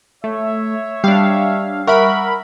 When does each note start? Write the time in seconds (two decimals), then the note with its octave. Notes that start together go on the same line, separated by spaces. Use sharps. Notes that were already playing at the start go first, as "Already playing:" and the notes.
0.24 A3 C#5 E5
1.04 G3 D4 F5
1.87 A#4 E5 F#5 B5 C#6